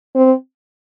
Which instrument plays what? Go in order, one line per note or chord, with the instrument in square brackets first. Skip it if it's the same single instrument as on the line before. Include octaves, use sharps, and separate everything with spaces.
[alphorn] C4